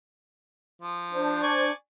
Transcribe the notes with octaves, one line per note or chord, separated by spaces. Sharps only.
F3
D4 C5
D5 G#5 C#6